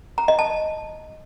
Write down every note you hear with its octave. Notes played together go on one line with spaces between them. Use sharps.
A#5
D#5
A5